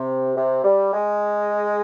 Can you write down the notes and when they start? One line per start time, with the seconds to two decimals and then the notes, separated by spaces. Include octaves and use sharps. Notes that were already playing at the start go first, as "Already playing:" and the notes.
Already playing: C3
0.36 C3
0.64 G3
0.93 G#3